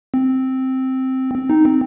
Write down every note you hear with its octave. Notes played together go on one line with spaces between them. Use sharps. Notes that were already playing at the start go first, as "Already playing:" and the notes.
C4
C4
D#4
C4